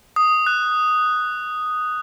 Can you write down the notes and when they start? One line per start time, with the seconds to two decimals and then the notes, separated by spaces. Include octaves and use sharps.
0.16 D#6
0.47 F#6